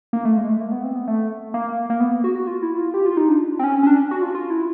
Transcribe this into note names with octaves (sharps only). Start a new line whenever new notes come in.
A#3
A3
G#3
A3
A#3
B3
C4
B3
A3
A#3
A#3
B3
F#4
F#4
F4
E4
F4
G4
F4
D#4
D4
C4
C#4
C#4
D4
F#4
F4
F4
E4